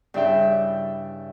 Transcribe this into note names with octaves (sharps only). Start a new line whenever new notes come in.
G2 C#3 E4 D5 E5 G5